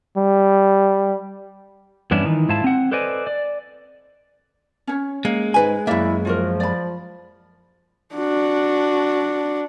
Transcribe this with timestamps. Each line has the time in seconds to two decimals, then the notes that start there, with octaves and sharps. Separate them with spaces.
0.17 G3
2.11 E2 G2 B3 C#4 D4 E4
2.25 D#3 E3 D#4
2.49 G#2 E4 F4 A5
2.64 C4 F#5
2.91 A4 B4 C5 D5 D#5 G#5
3.27 D5
4.87 C#4 C#5
5.25 G#3 A#3
5.54 G#2 B4 G#5
5.87 F#2 A#3 E4 D5 E5
6.25 F3 F4 F#4 A#4
6.60 D5 B5
8.15 D4 F#4